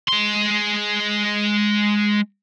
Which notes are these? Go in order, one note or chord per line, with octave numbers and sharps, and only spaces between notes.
G#3 C6